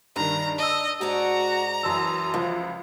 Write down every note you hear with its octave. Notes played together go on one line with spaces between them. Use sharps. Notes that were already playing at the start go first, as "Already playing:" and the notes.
G2 D#3 D4 A#5
D#5 A5 E6
G#2 F#4 G#4 D5 A#5
F#2 E3 A5 E6
C#2 C#3 F3